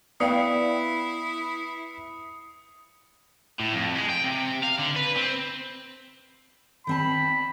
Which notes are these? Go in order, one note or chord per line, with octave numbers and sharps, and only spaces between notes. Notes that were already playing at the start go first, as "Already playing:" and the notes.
B3 E4 D5 F5 G5 D#6 C7 C#7
A2
F2
G#3
G5
C3
F5
D3
B4
C4
D#3 C4 A5 B5